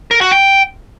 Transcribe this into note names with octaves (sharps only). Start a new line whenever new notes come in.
A#4
F#4
G5